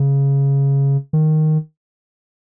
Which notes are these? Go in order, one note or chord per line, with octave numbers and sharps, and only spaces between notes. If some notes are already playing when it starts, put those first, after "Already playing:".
Already playing: C#3
D#3